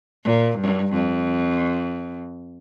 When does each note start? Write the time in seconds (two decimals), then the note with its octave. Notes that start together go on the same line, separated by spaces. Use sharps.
0.25 A#2
0.58 G2
0.93 F2